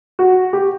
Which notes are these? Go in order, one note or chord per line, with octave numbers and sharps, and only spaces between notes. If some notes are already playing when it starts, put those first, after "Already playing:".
F#4
G4